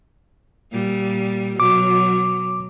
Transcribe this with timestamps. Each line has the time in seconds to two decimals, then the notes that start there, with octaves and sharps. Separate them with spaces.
0.72 A#2 G3
1.60 B2 F#3 D6